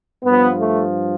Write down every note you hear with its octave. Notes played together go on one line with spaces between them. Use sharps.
G2 F3 B3
A3